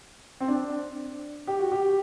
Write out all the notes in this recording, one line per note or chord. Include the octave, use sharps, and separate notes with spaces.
C4
D4
G4
F#4
G4